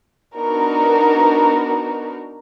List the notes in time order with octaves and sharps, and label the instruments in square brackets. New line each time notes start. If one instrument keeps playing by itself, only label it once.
[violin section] B3 D4 D#4 F#4 A#4